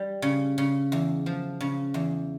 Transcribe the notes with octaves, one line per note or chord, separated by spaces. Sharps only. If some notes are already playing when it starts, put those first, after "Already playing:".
Already playing: G3
C#3
C#3
E2
F3
C#3
E2